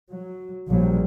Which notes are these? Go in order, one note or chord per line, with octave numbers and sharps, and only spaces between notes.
F#3
A#1 F#3 G3